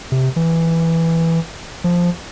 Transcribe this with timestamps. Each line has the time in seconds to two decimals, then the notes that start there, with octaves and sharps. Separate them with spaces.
0.12 C3
0.36 E3
1.84 F3